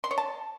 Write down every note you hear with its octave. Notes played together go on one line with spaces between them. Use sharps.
C6
C#5
A5